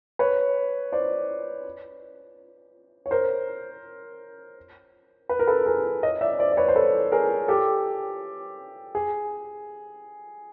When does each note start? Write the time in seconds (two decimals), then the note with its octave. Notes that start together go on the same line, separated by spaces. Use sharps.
0.19 B4 C#5
0.92 C5 D5
3.06 C#5
3.11 A#4 C5
5.29 B4
5.39 A#4
5.47 A4 B4
5.66 G#4 A#4
6.03 C#5 D#5
6.21 D5 E5
6.39 C5 D5
6.52 D5
6.57 B4 C#5
6.68 C5
6.76 A4 B4
7.12 G#4 A#4
7.48 G4 A4
8.95 G#4